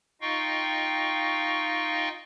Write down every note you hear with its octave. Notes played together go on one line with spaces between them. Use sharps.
D#4 F4 D#5 F5 G5 C#6